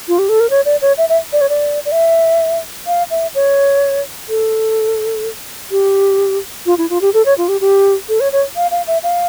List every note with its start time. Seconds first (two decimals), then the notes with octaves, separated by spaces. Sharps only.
0.08 F4
0.19 G4
0.29 A4
0.40 A#4
0.50 C#5
0.65 D5
0.82 C#5
0.98 E5
1.09 E5
1.33 D5
1.41 C#5
1.49 D5
1.85 D5
1.92 E5
2.87 F5
3.11 E5
3.35 C#5
4.29 A4
5.71 G4
6.66 F4
6.78 E4
6.90 F4
7.02 G4
7.14 A4
7.26 C#5
7.38 F4
7.49 G4
7.61 G4
8.09 A4
8.20 C#5
8.32 C#5
8.56 F5
8.71 F5
8.87 E5
9.03 F5